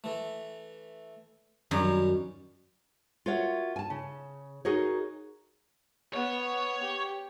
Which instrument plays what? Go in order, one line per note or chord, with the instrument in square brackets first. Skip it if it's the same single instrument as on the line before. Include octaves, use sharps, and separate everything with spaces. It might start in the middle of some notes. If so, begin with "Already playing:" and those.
[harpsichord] E3 A3
[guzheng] F#2 [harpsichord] D#3 G3 C#4
[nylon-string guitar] F4 F#4 A#4 C#5 E5 F#5
G#5 A5
C#3
D#4 F#4 G#4 A#4 C#5
[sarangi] B3 [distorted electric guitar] C#5
[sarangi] G4